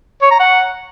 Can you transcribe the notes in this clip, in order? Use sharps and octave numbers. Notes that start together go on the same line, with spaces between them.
C#5
A#5
F#5